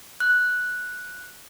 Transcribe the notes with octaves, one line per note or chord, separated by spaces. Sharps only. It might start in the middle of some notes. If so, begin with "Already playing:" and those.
F#6